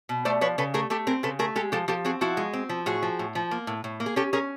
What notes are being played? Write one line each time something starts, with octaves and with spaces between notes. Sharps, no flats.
B2
A3 C5 D5
F3 B4 C#5
C#3 A4 B4
A3 G#4 A#4
A3 G4 A4
C4 G#4 A#4
C#3 A4 B4
A3 G#4 A#4
G#3 G4 A4
F3 G4 A4
F3 G4 A4
C4 F#4 G#4
F3 E4 F#4
G#3
C4
F3
A2 F#4 G#4
F3
A2
F3
A#3
A2
A2
A#3
G#4
C#4 G4 A4
C#4 G#4 A#4